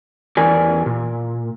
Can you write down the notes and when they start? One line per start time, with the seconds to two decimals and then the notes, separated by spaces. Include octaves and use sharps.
0.37 E2 G4 A#4 D5 G#5
0.86 A#2